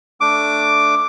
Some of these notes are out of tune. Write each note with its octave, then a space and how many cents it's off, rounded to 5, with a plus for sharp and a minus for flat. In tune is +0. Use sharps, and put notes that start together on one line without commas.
A3 +0 D4 +0 D6 +0